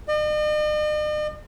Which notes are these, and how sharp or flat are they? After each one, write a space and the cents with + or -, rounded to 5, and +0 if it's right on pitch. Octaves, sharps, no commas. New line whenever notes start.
D#5 -45